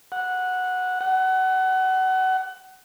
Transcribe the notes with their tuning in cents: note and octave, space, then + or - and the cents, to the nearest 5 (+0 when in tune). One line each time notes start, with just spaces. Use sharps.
F#5 -10
F#5 +25